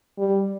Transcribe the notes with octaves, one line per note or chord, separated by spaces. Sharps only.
G3